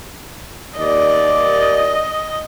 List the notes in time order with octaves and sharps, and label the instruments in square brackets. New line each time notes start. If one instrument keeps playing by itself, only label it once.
[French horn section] D#2 D5 [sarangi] D#5